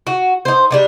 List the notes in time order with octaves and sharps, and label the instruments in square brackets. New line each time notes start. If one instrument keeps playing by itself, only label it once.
[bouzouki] F#4
D#4 C5
G3 D4 D#4